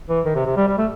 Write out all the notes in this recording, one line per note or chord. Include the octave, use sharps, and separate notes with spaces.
E3
D#3
C3
C3
G3
G3
A3